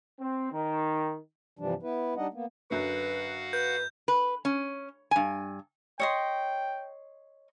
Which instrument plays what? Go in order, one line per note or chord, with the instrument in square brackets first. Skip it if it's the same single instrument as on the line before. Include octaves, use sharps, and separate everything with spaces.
[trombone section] C4
D#3
[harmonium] G2 C3 E3 F3 G3 D4
B3 E4 B4
G3 D4 D#4 D#5 F#5
A#3 B3
[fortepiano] F#2 D3 [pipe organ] F#4 F5 F#5 [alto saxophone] B4
[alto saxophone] B4 [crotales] G6
[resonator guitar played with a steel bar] B4
C#4
G2 G#5
[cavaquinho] C#5 D#5 C6 [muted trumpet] G5